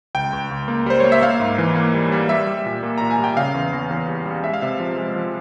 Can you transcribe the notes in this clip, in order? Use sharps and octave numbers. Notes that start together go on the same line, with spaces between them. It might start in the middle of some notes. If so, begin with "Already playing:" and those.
C#2 G5
C#2
C#2
A#3
G3 C5
A#3 C#5
E5
A#3 F5
G#2
E3
A#3
G3
G3
G3 E5
G3
A#2
A#3
A#2 A#5
G#5
G3 G5
C#3 F5
E2
E2
E2
G3
G3
G#3 E5
F5
C3 E5
F3
G#3
F3